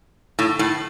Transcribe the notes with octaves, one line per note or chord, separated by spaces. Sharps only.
A2
A2